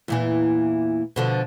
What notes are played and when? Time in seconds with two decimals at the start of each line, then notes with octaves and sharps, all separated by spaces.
0.08 E2 A#2 E3
1.16 B2 D3 F3